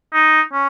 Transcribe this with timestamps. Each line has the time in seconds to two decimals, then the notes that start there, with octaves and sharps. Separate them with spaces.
0.14 D#4
0.53 C#4